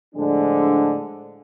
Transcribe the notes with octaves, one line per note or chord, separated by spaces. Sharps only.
A2 D3 F3 G#3 D4